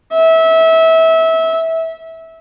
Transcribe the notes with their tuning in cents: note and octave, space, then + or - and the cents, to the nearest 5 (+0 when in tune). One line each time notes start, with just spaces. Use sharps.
E5 -25